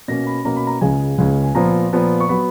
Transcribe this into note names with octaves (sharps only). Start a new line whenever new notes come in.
B2 A#3 C#4 A#6
B5
B2 A#3 C#4 A#5
B5
A#5
C#2 C#3 G#3 C#4 G#5
C#2 C#3 G#3 C#4
G#5
A#2 F3 B3 A#5
A#2 F3 B3
C#6
F#3 B3 B5